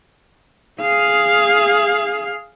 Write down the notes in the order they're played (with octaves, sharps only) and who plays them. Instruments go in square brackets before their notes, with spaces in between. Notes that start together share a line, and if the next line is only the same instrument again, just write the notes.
[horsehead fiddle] G#4 F5